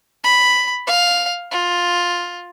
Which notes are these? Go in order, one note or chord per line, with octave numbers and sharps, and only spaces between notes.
B5
F5
F4